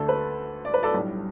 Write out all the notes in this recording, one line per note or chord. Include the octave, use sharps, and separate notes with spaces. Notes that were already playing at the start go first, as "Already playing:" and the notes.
Already playing: D2 D3 A3 D4 A4
B4
D5
B4
A4 D5
B1 A2 G3 D4